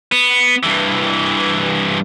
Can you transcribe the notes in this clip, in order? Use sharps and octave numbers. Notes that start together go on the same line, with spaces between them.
B3
G2 E3